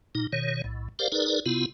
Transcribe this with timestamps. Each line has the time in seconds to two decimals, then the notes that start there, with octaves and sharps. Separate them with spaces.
0.15 A#2 D#4
0.33 B2 D#3 C#5
0.64 B1 A2
0.99 G4 A#4 C5 D5 F5
1.12 D#4 G#4 A#4 B4 D5
1.46 C3 B3 E4 F4